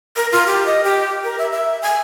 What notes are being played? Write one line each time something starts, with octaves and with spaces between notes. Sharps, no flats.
A#4
F4
G4
D#5
G4
A#4
E5
E5
G#5